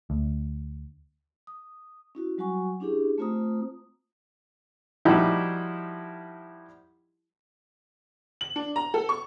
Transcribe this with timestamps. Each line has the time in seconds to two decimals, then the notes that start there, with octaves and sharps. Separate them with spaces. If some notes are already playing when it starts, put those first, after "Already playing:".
0.10 D2
1.47 D#6
2.15 C#4 E4 F#4
2.38 F#3 G3 F#4 F#5 G#5 C#6
2.80 C#4 D4 E4 G4 G#4
3.18 A3 C4 F4 C5 A#5 D#6
5.05 F3 G3 D#4 E4 F#4 G4
8.41 F#7
8.56 D4
8.76 A#5
8.94 A4
9.09 C#6